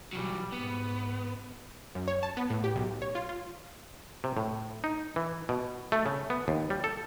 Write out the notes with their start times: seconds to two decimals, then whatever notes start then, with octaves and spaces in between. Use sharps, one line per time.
0.13 B2 E3 F#3 G3
0.52 G#2 B3
1.95 F#2
2.08 C#5
2.23 A5
2.37 B3
2.50 A2
2.64 G4
2.76 B1
3.02 C#5
3.15 F4
3.29 F4
4.24 C3
4.37 A2
4.84 D#4
5.16 E3
5.49 B2
5.92 A3
6.06 C#3
6.30 B3
6.48 D#2
6.70 G3
6.84 A4